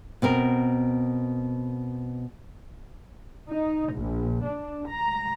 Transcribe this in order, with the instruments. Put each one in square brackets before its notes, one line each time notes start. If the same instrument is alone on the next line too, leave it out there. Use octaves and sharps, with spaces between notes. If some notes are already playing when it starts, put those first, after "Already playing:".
[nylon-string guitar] B2 C4 A#4
[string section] D#4
A#1
D4
A#5